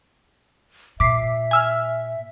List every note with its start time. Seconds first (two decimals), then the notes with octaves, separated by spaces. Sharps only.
1.00 A#2 E5 D6 B6 C7
1.51 G#5 E6 F6